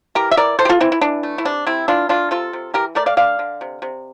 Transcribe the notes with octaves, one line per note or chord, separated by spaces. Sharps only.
E3 G4 A#4
E5
E3 A#4 D5
E3 A4 C5
G4
F4 A4
E3 C4 E4
E4
E3 D4
A3
E4
C3 D4
C3 C4 E4
E3 D4 F4
A3 D4 F4
C3 F4 A4
C3
E3 G4 A#4
A3 A#4 D5
D5 F5
D3 D5 F5
D3
C3
C3